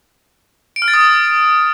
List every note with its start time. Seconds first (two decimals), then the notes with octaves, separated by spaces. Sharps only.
0.76 D7
0.82 F6
0.88 A6
0.94 D#6